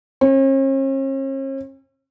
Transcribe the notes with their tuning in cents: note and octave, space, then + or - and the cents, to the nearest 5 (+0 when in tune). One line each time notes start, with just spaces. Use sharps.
C#4 -45